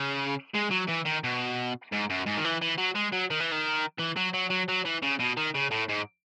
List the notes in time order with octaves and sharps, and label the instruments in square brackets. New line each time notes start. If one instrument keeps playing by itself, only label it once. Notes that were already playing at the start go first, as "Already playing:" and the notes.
Already playing: [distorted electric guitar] C#3
G#3
F#3
E3
D#3
B2
G#2
F#2
G#2
D#3
E3
E3
F#3
G#3
F#3
D#3
E3
D#3
E3
F#3
F#3
F#3
F#3
E3
C#3
B2
D#3
C#3
A2
G#2